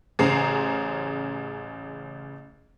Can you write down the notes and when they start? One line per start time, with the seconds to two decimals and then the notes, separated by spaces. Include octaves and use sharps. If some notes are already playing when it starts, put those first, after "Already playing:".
0.19 A1 C#3 G#4 C5 A#5 C7